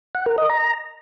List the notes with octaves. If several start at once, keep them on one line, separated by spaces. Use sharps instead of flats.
F#5
A#4
D#5
A#5